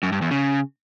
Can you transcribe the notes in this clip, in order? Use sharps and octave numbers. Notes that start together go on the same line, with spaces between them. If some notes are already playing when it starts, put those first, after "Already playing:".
F#2
G2
E2
C#3